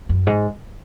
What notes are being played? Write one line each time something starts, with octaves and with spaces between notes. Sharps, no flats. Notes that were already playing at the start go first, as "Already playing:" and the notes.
F#2
G#2